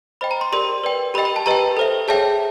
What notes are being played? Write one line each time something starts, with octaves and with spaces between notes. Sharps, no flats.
C5 D#5 G5 B5
A#5
C6
G4 A#4 D5 C6
B4 D5 G5
G4 A#4 D#5 G5 B5
B5
A5
G4 B4 D#5 G5 A#5
A4 C5 E5
G#4 C#5 E5 G5 A5